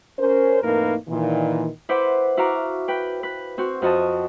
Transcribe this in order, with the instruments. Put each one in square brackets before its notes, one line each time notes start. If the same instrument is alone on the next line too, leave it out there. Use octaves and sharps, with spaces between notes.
[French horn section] C#4 A#4 C5
F2 A2 A#3 D#4 A#4 B4
A#2 D#3 E3
[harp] E4 B4 C5 F#5 D6
E4 F#4 F5 A#5 D6
B4 G5
B4
C4 F#4
F2 F#4 D#5 A5